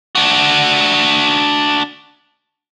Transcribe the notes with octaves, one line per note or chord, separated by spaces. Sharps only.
D4 F#4